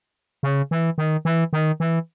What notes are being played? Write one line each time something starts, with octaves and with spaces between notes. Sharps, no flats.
C#3
E3
D#3
E3
D#3
E3